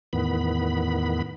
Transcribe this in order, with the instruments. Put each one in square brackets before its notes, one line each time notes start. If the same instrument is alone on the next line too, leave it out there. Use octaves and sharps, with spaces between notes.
[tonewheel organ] E2 A2 D#3 B3 B5